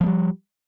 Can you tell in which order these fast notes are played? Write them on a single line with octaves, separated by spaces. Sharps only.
F3 A3 G3